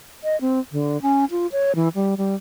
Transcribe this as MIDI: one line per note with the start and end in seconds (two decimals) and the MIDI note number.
0.24 0.39 75
0.41 0.60 60
0.72 1.00 50
1.02 1.25 61
1.31 1.47 65
1.52 1.72 73
1.75 1.88 52
1.95 2.15 55
2.17 2.35 55